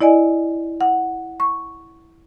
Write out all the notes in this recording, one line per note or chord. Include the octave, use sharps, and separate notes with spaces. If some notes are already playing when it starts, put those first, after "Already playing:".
E4 D5 D#5 G#5
F#5
C#6